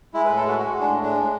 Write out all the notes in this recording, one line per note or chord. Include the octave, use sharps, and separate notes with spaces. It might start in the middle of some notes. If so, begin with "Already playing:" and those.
G#3 E4
B4
A2
A4
G#3 F#4
G#3 F#4
G#3
D4
A2
G#3 D4
A2